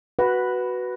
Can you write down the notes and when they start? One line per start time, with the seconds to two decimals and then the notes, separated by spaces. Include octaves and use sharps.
0.19 F#4 B4